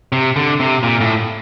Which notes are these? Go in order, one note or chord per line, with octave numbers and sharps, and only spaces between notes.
C3
D3
C3
A#2
A2